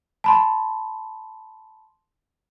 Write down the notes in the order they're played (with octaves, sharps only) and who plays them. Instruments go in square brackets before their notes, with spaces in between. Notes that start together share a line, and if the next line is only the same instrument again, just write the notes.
[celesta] A5 B5 C6